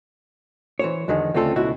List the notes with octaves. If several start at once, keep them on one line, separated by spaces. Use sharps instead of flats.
E3 C5 C#5
E2 D3 D#3 F3 G#3
D2 C#3 C4 F4 A4
C#2 B2 E4 F#4